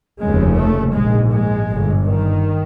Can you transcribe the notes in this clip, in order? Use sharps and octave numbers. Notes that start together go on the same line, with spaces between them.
F1 D#2 C#3 G#3
A3
A#1 G#2 G#3
G#3
G1 G2
D#3